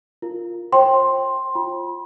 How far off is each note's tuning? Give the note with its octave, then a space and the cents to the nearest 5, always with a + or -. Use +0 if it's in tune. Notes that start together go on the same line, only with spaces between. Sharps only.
F4 +0 A#4 +0
C5 +40 G5 +0 C6 +10
F4 +0 B5 -40